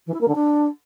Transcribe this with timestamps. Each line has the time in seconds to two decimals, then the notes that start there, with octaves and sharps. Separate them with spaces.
0.06 E3
0.13 E4
0.20 A#3
0.28 D3
0.35 D4